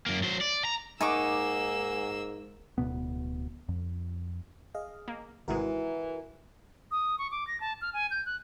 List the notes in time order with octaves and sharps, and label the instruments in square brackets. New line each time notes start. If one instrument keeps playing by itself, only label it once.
[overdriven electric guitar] F#2 A#3
F#3 C5
D5
A#5
[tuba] G#2 [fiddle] A#3 E6 [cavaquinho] D#4 C#6 D6 [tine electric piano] F#5 G#5
[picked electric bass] D1 D2 B2 B3
F2
[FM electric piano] G#4 D#5 F5
[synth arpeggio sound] A#3
[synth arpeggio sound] G#1 C3 G#3 [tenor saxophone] E3 [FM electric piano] E4 F#4 A#4
[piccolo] D#6
C#6
D6
A#6
A5
F6
G#5
G6
F#6